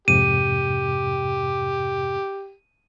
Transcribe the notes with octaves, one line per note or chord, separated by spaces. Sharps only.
F2 G#2 C3 G4 D#7